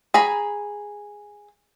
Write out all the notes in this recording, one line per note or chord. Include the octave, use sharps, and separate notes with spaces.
G#4 A#5 B5